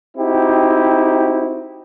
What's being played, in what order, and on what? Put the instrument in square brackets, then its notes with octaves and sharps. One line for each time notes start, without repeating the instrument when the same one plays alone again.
[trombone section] C4 D#4 E4 F#4 G4